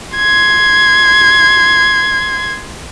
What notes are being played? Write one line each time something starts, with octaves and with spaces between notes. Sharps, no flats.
C6 G#6